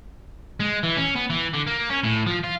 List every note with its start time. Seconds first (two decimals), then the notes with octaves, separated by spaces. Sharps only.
0.60 G#3
0.83 E3
0.97 C#4
1.16 B3
1.30 E3
1.53 D3
1.67 A#3
1.89 C#4
2.04 A2
2.26 F3
2.44 F4